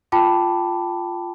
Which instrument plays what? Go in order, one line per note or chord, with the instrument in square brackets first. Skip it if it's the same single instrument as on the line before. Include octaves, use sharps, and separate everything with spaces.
[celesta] F4 G5 A5 B5 D6